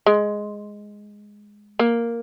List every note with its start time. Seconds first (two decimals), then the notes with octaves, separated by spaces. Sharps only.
0.06 G#3
1.79 A#3